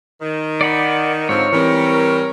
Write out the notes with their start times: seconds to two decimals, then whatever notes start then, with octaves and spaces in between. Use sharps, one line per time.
0.21 D#3
0.61 D5 F#5 B5
1.29 G#2 D3 F3 C4 C#5
1.52 E3 G3 C4 A#4